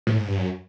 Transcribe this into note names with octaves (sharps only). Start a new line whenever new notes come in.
A2
G#2
G2
F#2